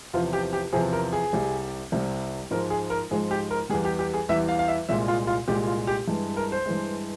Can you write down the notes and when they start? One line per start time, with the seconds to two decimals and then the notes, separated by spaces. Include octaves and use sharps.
0.14 E2 C3 F3 F4
0.33 G4
0.53 G4
0.73 E2 C3 F3 G#4
0.93 A#4
1.13 G#4
1.33 C2 C3 G3
1.92 C2 C3 G3
2.51 G#2 F3 G#3 A#4
2.70 G#4
2.90 A#4
3.11 G#2 F3 G#3 G#4
3.31 G4
3.51 A#4
3.70 E2 E3 G3 G#4
3.85 G4
3.99 G4
4.14 G#4
4.29 E2 E3 G3 E5
4.48 F5
4.59 F5
4.68 E5
4.89 C2 A#2 G#3 E5
5.08 F4
5.27 F4
5.48 C2 A#2 G#3 G4
5.67 F4
5.87 G4
6.08 G2 E3 G#3
6.37 A#4
6.52 C5
6.66 G2 E3 G#3